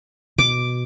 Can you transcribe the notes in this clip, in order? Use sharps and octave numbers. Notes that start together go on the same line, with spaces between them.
B2 D6